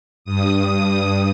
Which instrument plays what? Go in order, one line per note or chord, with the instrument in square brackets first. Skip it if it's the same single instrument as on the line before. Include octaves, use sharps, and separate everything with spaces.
[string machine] G2 D#6